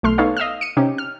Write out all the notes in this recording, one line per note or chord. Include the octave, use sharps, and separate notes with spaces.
B1 A3 C6 F6
B3 D#4 A4 C#5 F5
D#5 F5 E6 F6
C#7 D#7
C3 C#4 D#4 G4
F6